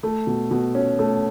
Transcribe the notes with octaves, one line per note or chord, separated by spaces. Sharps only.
A3
B2
B2
C#4
A3